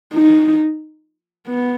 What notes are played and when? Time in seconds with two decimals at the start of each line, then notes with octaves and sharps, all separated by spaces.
0.14 D#4
1.47 B3